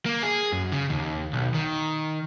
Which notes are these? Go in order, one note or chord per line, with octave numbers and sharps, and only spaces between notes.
A#3
G#4
F#2
C#3
D#2
B1
D#3